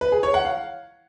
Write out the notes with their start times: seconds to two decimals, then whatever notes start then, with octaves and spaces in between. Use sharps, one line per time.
0.01 B4
0.12 G#4
0.23 C#5
0.34 F#5
0.45 F5